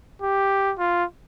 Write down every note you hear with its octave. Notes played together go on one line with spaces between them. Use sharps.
G4
F4